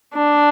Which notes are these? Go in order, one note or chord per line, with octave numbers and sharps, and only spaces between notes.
D4